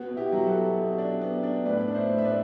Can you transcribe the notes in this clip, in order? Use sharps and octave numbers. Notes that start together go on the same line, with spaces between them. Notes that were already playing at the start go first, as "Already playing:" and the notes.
Already playing: B3 F#4
B2
E4 G4
F#3
F#4 A4
B2
B2
D4
B3
D4
A2 B4 D5
D4
C5 E5
A2
E5
B4 D5